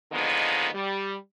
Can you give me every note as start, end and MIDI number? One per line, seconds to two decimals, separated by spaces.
0.12 0.68 50
0.12 0.68 51
0.12 0.68 53
0.12 0.68 56
0.12 0.68 58
0.12 0.68 59
0.74 1.15 55